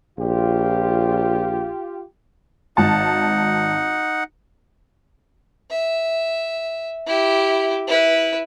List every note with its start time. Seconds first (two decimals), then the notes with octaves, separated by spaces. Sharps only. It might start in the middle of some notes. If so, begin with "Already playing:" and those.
0.19 A#1 F4 G4
2.77 G#1 D#4 F#5 A5
5.70 E5
7.07 E4 G4
7.87 E4 B4